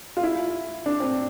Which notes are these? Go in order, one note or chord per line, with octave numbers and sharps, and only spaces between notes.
F4
E4
D4
C4